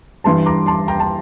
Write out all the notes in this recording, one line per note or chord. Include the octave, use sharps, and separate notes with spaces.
G2 E3 G3 A5 C6
A#5 D6
A5 C6
G5 A#5
A5